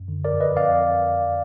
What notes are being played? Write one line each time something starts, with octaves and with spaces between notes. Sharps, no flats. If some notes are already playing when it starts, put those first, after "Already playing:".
Already playing: F#2
D3
A#4 D5
F2
B4 D#5
F2 D5 F5